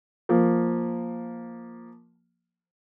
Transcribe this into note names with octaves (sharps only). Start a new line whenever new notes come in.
F3 A#3